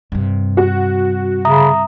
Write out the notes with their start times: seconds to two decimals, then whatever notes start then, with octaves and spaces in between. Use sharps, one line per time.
0.12 G2 C3
0.57 F#4
1.45 C#3 E5 A#5 D#6